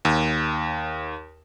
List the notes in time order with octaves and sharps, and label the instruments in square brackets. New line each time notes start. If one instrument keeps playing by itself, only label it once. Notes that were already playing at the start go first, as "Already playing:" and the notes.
[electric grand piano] D#2